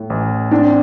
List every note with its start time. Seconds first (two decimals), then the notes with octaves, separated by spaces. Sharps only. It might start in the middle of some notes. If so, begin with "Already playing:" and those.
Already playing: A2
0.10 A1
0.51 C4 D4